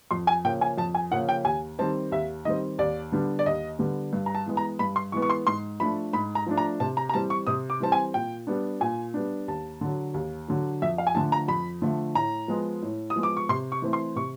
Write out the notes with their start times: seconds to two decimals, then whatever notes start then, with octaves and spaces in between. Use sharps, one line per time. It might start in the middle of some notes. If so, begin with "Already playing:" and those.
0.11 F2 C6
0.27 G#5
0.45 C#3 F3 A#3 G5
0.61 G#5
0.78 F2 A5
0.95 G#5
1.11 C#3 F3 A#3 F#5
1.29 G5
1.45 D#2 G#5
1.79 D#3 G3 C4 A5
2.12 D#2 E5
2.45 D#3 G3 C4 D#5
2.79 D#2 D5
3.12 D3 G3 B3 D4
3.39 D5
3.46 D#2 D#5
3.79 D3 G3 B3 D4
4.13 G2
4.26 A#5
4.35 A5
4.46 E3 G#3 B3
4.57 A#5
4.79 G2 B5
4.96 C6
5.12 E3 G#3 B3 C#6
5.22 C#6
5.30 C6
5.47 G#2 C6
5.80 F3 A3 D4 B5
6.13 G#2 B5
6.35 A#5
6.46 F3 A3 D4
6.57 A#5
6.80 C3 A5
6.97 A#5
7.09 A#5
7.14 E3 G3 C4 A5
7.30 C#6
7.47 C3 D#6
7.70 D6
7.80 E3 G3 C4 A5
7.92 G#5
8.14 A#2 G5
8.47 G3 B3 D4
8.81 A#2 G#5
9.14 G3 B3 D4
9.48 D#2 A5
9.81 D3 F#3
10.14 D#2
10.48 D3 F#3
10.82 F2 E5
10.98 F5
11.07 G#5
11.15 D3 F3 A3 A5
11.32 A#5
11.48 F2 B5
11.82 D3 F3 A3
12.15 A2 A#5
12.48 F3 G#3 B3
12.82 A2
13.10 D#6
13.16 F3 G#3 B3
13.23 D6
13.37 C#6
13.49 C3 C6
13.72 C#6
13.82 E3 A3 C4
13.93 C6
14.16 C3 C#6